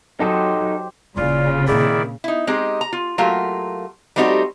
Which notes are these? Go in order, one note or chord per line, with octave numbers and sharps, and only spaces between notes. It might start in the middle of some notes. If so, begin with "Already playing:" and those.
F#3 D#4 G4 A4 C5 D#5
D#1 C#3 E4 F4 D5
A#2 D#3 C4 E4 G#4 D5
D#4 E4
G#3 C4 D#4 G4 G#4
A#5
F4
F#3 A3 A#3 F4 G4
G3 A3 C4 D#4 F#4 G4